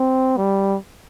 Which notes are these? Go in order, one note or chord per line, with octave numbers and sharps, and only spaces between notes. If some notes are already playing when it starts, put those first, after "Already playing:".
Already playing: C4
G3